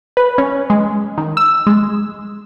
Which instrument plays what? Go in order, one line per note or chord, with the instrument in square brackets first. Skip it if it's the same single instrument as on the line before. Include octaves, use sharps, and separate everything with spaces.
[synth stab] B4
C#4
G#3
D#3
E6
G#3